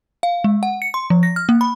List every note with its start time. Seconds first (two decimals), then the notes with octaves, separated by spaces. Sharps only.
0.23 F5
0.44 G#3
0.63 F#5
0.82 C#7
0.94 C6
1.10 F3
1.23 A#6
1.36 F6
1.49 A#3
1.61 B5